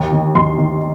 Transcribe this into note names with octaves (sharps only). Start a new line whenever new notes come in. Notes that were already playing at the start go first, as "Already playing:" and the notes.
Already playing: D#2
D#3
D#2 C6
D#3